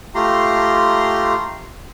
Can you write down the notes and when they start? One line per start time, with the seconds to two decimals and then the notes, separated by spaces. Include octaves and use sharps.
0.15 A3 F4 G4 A#5 C6